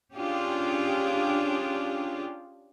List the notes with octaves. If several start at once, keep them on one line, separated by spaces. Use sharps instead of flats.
C#4 D4 F4 G4 G#4